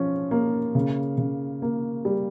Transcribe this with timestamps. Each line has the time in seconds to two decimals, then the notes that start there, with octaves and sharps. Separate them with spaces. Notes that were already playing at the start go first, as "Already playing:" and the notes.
Already playing: F3 C#4
0.31 A#3
0.75 C#3
1.18 C#3
1.62 A#3
2.05 G3